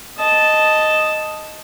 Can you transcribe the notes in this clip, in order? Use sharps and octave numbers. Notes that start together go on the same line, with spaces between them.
D#5 A5